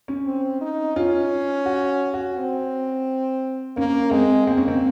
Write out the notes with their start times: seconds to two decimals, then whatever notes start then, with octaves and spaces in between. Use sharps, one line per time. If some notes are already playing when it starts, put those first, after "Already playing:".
0.08 C#4
0.25 C4
0.61 D#4
0.96 C#4 F4
1.66 F#4
2.14 F#4
2.37 C4
3.77 A#3 C#4
4.11 G#3 C4
4.47 A#3 C4
4.57 C#4
4.68 C4